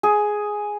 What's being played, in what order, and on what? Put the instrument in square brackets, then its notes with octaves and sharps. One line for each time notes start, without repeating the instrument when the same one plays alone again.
[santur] G#4